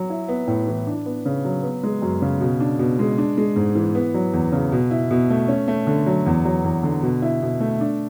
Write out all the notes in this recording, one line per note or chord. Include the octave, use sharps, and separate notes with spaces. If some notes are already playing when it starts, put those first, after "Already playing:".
Already playing: F#3
E4
B3
A2
E3
D4
B3
C#3
F#3
B3
G#3
F#2
C#3
B2
D4
B2
G#3
D4
G#3
G#2
E3
B3
F#3
E2
C#3
B2
E4
B2
A3
C#4
A3
D3
F#3
E2
F#3
E2
D3
B2
E4
B2
A3
D4